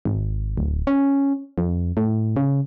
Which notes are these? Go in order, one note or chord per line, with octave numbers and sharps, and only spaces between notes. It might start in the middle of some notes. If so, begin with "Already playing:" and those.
G#1
D1
C#4
F2
A2
C#3